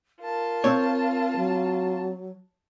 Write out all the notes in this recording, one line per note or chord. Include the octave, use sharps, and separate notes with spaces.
F4 A#4 A5
C4 C#5
F#3